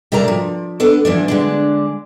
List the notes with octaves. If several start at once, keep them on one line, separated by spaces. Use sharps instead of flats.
C3 A3 D4 A#4 D5 A#5
F3
B3 D4 A4
E3 F3 B3 D4
D3 G#3 D4